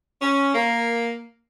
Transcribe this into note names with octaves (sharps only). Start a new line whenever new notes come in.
C#4
A#3